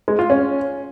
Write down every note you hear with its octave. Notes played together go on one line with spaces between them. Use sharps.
G#3
F4
C#4